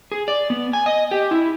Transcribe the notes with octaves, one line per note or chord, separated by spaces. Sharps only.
G#4
D5
B3
G#5
D#5
G4
E4